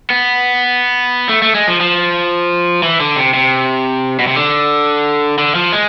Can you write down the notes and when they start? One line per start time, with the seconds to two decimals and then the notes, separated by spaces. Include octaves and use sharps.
0.10 B3
1.29 A3
1.42 A3
1.55 G#3
1.68 F3
1.80 F3
2.83 E3
3.00 D3
3.16 C3
3.34 C3
4.19 B2
4.27 C3
4.36 D3
5.38 D3
5.55 F3
5.72 G#3